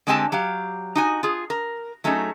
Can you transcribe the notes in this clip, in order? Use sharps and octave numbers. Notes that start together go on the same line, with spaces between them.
D3 G#3 C4 G4 G#5 A5
F#3 G4 F5
D#4 F#4 G#5
F4 G#4
A#4
F#3 A3 C#4 D#4 G#4